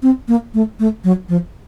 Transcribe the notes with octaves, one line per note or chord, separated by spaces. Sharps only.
C4
A#3
A3
A3
F#3
F3